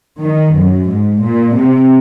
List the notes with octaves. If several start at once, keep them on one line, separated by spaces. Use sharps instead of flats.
D#3
F#2
G#2
A#2
C3